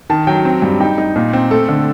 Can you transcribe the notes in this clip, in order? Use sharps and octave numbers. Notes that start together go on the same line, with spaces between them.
D#3 A5
F#3 G5
C4
G2
D#4 G5
D#4
A#2
C4
A3 A4
D3